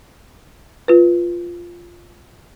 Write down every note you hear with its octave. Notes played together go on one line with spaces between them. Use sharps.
F4 B4